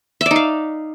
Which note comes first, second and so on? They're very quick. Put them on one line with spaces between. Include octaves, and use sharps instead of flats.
E5 D5 D#4 F5